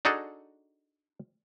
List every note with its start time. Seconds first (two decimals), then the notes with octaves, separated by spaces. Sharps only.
0.05 D4 D#4 F#4 G#4 A4